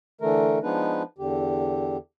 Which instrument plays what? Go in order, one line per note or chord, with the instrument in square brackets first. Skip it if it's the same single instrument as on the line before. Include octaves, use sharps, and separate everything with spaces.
[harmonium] D3 E3 A3 A#4
F3 G#3 B3 D4 D#4 B4
E2 D3 G4